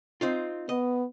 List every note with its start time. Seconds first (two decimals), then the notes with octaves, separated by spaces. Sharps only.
0.21 C4 D#4 F4
0.69 B3 D#5